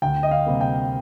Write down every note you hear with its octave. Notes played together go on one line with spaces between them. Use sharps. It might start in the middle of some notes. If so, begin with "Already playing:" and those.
D2 G5
D#5
F5
C3 G3 A#3
G5